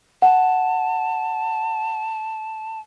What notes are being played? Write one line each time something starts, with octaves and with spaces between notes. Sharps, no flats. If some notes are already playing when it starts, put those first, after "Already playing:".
F#5 A5